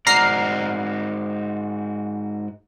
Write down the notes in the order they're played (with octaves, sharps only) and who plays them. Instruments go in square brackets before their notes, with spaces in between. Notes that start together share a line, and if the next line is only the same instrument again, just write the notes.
[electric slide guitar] G#2 F#4 D5 [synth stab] A#5 F6 C7